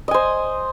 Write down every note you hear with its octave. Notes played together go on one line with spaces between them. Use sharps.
C5 D#5 G#5